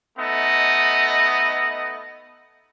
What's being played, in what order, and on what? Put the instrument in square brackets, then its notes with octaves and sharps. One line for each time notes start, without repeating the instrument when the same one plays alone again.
[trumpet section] A3 B3 D#4 D#5